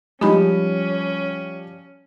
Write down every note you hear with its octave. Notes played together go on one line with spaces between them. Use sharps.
F3 G3 G#3 C#4 D#4 G4 B5